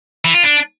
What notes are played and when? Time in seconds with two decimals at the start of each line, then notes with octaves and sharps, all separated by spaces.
0.25 E3
0.34 F4
0.44 D4